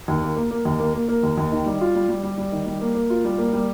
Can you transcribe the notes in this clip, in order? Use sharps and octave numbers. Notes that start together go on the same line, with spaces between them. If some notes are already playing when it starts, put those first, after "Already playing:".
D#2
A#3
A#3
A#3
D#2
A#3
A#3
A#3
D#2
D#2
D#3
G3
F4
G3
G3
G3
G3
D#3
G3
A#3
A#3
F4
G3
A#3
G3